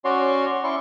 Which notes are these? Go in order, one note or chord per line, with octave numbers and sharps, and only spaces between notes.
C#4 F#4 C#5 D5 C6
C#4 E4 D5 C6 C#6